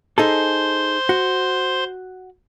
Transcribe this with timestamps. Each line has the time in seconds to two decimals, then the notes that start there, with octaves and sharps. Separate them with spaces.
0.18 D#4 G#4 A4 C5 C6
1.09 F#4